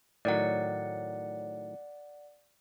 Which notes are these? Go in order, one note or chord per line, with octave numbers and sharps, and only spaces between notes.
A2 D#3 F#3 D5 F#5